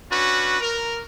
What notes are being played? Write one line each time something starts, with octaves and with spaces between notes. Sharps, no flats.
C#4 D4 F#4 B4
A#4